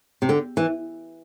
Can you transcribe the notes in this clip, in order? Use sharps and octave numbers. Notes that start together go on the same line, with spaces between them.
C3
D3
E3